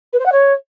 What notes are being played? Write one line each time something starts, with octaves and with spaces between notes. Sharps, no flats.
B4
C5
F#5
C#5